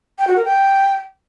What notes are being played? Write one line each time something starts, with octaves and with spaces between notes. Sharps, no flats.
G5
F#4
A#4
G5